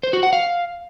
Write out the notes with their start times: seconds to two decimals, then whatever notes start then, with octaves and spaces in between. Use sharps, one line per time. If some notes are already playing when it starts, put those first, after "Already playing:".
0.03 C5
0.13 F#4
0.23 F#5
0.33 F5